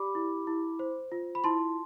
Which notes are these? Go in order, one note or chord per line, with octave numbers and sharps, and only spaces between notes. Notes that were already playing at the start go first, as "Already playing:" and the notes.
Already playing: G4 D5 B5 D6
E4
E4
C5
F4
B5
E4 A5 C6